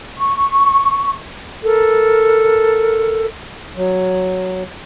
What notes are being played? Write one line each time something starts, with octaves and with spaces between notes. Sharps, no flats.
C#6
A4 A#4
F#3